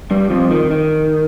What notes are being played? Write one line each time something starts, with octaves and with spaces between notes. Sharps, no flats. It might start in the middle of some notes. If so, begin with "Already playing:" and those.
G2 G3
F2 F3
D#3
D#3